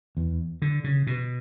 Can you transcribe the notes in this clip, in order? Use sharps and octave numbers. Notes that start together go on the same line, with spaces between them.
E2
D3
C#3
B2